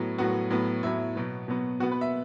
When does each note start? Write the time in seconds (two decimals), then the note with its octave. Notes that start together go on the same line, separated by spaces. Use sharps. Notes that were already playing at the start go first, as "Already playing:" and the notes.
Already playing: A2 F#3 B3
0.18 A2 F#3 B3 F#4
0.50 A2 F#3 B3
0.83 A2 F#3 B3 E4
1.16 B2 F#3 B3
1.48 B2 F#3 B3
1.80 B2 B3 F#4
1.92 B4
2.01 E5